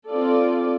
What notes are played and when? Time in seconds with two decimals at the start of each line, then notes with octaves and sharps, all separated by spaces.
0.09 C4 F4 A4 D5